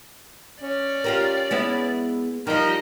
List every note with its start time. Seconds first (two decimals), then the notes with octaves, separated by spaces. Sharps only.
0.62 C#4 D5
1.04 F4 G4 A#4
1.51 G#3 B3 E4
2.47 F3 G3 D#4 A#4 D#5